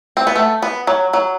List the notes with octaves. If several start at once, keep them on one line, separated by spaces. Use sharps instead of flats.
C4
B3
A3
B3
F#3
F#3